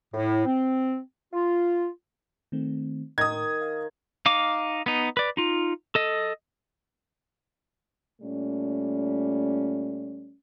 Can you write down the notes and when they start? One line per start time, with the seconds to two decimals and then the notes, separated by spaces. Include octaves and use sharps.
0.14 A2
0.45 C4
1.33 F4
2.52 D#3 A3 C4
3.18 A2 D#3 D#6 G#6
3.62 F5
4.26 D#4 F5 D6
4.86 B3 D#4
5.17 B4 D5
5.37 D#4 F4
5.95 A4 D#5
8.22 A#2 G3 A3 C#4